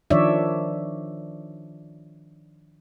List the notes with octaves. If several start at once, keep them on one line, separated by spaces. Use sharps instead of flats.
D#3 F3 D4 C#5 D5 E5